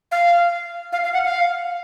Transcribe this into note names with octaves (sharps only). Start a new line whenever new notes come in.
F5
F5
F5
F#5
F5